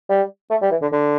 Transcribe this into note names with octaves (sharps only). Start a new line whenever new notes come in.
G3
A3
G3
E3
D3
D3